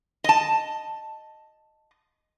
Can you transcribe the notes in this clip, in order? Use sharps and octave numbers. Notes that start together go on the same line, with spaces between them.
D#5 A5